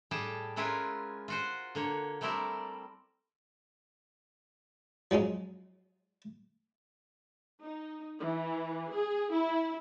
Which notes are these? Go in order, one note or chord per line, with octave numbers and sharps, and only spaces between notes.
A2 G3 G#4 G5 A5
G#3 C#4 E4 F4 A#4 B4
F4 F#4 C5
D3 A#3 C#5
G3 A3 C4 E4 A#4 D5
F3 F#3 G#3 C#4
D#4
E3
G#4
E4